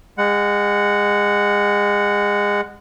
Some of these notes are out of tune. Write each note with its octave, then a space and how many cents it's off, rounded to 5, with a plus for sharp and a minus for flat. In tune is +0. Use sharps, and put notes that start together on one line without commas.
G#3 -25 F#5 +0